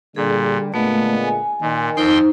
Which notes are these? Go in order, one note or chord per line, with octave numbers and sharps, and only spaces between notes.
A#2 D3 G3 G#4
A#2 D3 G#3 A3 B3
G#5
A#2 D#3
F2 D#4 C5 G5 C6